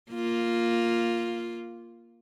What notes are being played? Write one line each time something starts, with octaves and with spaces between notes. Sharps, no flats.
A#3 F4